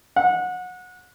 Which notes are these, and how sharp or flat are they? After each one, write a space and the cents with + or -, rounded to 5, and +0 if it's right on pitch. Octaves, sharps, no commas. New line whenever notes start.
F#5 -25